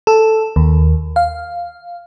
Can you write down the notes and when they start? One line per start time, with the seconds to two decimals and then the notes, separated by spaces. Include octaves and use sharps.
0.07 A4
0.56 D#2
1.16 F5